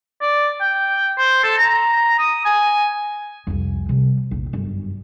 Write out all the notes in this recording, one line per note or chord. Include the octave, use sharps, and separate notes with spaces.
D5
G5
C5
A4
A#5
D#6
G#5
C2 F2
C3 G3
A#1 E2
G1 F#2